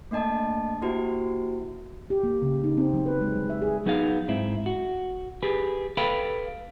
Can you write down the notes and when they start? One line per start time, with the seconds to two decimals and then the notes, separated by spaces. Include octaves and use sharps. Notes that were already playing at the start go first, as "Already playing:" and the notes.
0.11 A3 A#3 D4 D#5 A5
0.82 A#3 E4 F#4 G4 C5
2.10 G4
2.24 A#3
2.42 C#3
2.64 D#4
2.77 C4
2.94 F#3
3.06 B4
3.21 G#3
3.36 G3
3.50 E5
3.62 G#4
3.86 F#3 B3 D#4 G#4 F5
4.28 G#2 C4 E4
4.66 F#4
5.42 G4 G#4 B4
5.97 A4 B4 F5 G5 B5